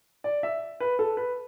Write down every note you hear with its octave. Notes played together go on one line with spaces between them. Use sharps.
D5
E5
B4
A4
B4